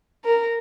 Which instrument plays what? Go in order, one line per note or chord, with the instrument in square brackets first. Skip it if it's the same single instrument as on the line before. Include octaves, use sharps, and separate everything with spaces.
[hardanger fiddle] A#4